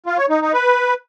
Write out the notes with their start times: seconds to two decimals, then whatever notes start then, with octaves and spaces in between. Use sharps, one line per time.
0.06 F4
0.18 C#5
0.30 D#4
0.41 D#4
0.53 B4